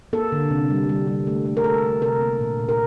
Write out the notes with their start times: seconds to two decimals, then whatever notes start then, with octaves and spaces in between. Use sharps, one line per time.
0.13 A#3 A4
0.32 D3
0.50 C3
0.70 G3
0.89 G3
1.07 G3
1.27 A3
1.46 A3
1.57 A#4
1.64 A3 A4
1.84 A3
2.02 C3 A#4
2.21 A#3
2.40 A#2
2.59 A#2
2.69 A#4